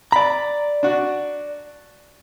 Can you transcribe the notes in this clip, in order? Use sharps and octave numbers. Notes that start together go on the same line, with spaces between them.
D5 A#5 B5
D4 F#4